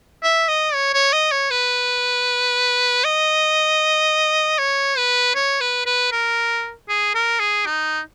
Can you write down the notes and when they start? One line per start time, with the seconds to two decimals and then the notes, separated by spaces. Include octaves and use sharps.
0.23 E5
0.48 D#5
0.74 C#5
0.93 C#5
1.13 D#5
1.31 C#5
1.50 B4
3.04 D#5
4.58 C#5
4.97 B4
5.35 C#5
5.61 B4
5.86 B4
6.12 A#4
6.89 G#4
7.15 A#4
7.40 G#4
7.66 D#4